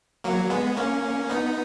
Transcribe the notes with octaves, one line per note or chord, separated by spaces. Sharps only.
F#3 A#3
G#3 B3
A#3 C#4
B3 D#4